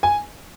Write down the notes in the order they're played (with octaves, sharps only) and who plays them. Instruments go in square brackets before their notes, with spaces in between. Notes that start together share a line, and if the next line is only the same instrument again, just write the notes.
[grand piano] G#5